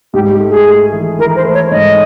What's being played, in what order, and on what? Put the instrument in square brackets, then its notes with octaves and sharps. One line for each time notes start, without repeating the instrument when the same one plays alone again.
[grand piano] G#2 [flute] G4
[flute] G4
[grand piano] A3
[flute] G#4
[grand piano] A3
E3
[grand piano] E3 [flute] A#4
[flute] C5
[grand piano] A3
[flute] C#5
[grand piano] G#2 [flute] D#5